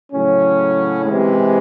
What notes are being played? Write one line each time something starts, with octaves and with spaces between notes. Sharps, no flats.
A2 C#3 F#3 C#4
C3 E3 G#3